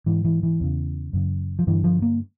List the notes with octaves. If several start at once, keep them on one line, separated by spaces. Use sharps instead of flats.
G#2 E3
E3
E3
E2 C#3
F#2 C#3
F3
G2 D3 E3
F3
A#3